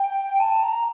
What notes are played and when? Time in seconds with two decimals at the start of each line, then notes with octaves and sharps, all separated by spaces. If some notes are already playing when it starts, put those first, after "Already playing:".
Already playing: G5
0.39 A5
0.63 A#5